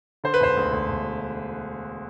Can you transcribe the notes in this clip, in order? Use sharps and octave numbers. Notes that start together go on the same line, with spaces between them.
D3 C5
B4
E1 C5
D2
D2
E1